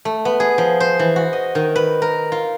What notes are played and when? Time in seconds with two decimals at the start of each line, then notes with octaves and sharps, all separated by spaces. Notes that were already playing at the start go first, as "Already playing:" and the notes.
0.05 A3
0.25 B3
0.40 G#4
0.58 F3
0.80 C5
0.99 E3
1.16 F#4
1.33 D#5
1.55 D#3
1.76 B4
2.02 A#4
2.32 F4